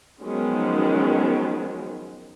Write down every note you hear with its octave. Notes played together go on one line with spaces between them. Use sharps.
D#3 F3 F#3 G#3 B3 C#4